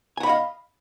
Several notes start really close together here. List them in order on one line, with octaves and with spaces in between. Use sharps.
G#5 F#5 B5 D#5 F5